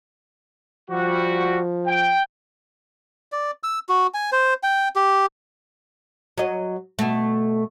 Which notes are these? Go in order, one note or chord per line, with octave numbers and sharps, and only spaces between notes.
F3 G3 F#4
G5
D5
E6
F#4
G#5
C5
G5
G4
F#3 D#5
B2 A3